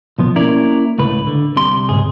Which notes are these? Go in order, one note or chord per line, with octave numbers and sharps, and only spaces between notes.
B1 F3 B3
A#3 C#4 E4 A#4 D5
C#2 A2 B4
D3
C2 C3 C6
C#2 G#2 G#4